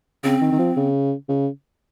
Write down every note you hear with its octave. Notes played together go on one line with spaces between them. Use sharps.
C#3 C4
D#3
D#3
F3
C#3
C#3